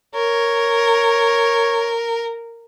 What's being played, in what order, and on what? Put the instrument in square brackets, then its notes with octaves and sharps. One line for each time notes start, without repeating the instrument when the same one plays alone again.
[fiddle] A#4 [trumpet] C#5